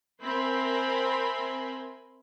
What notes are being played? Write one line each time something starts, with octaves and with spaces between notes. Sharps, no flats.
C4 A#4 E5 G#5 B5 C6